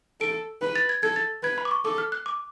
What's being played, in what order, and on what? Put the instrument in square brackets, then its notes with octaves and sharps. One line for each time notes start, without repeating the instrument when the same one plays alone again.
[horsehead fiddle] A4 [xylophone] D7
[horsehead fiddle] B4
[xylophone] A6
G#6
[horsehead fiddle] A4 [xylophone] G#6
[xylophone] A6
[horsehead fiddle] B4 [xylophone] G#6
[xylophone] B5
D6
C#6
[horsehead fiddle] A4 [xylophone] D6
[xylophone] F6
F#6
D6